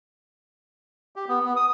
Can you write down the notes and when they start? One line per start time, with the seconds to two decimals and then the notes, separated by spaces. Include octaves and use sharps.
1.16 G4
1.28 B3
1.45 B3
1.57 D#6